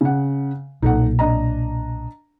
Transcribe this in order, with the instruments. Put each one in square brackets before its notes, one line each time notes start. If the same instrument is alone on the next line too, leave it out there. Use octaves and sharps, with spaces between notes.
[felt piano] C#3 F#5
[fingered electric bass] B1 A#2 [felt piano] D#4 A4 F#5
[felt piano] D4 D#5 A#5